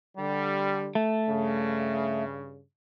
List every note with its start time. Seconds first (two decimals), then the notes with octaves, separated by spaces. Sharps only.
0.17 D3 G3
0.95 A3
1.30 G2 C#3